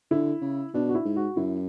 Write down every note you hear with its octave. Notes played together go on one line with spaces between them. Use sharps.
D3 E4
C#3
B2 D4
F#4
E4
G#2
F#4
F#2 E4